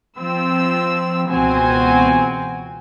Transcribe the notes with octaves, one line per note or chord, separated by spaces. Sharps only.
F3 C4 E6
C#2 B2 E3 C4 F#4 G#5